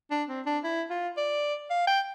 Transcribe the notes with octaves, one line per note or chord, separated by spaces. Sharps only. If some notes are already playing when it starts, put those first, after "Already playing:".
D4
C4
D4
E4
F4
D5
F5
G5